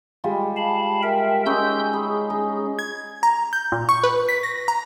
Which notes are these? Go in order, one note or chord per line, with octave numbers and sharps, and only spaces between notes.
G3 G#3 F4
F5 A5 B5
A#4 E5 G5
G#3 C#4 D#4 C6 E6 G6
G#4 B5
D#4
G#6
A#5
G6
A#2
C#6
B4
B6
A#6
A#5